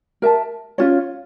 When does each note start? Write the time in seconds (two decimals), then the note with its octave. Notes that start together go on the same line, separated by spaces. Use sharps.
0.22 A#4 E5 A5
0.78 C#4 F4 C#5